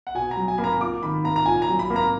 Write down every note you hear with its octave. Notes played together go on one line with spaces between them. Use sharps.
F#5
B2 G#5
A#5
F#3
G#5
A#3 B5
A#5
F4 D6
D#3 B5
A#3 A#5
A#5
A#2 G#5
A#5
F#3
B5
A#3
A#5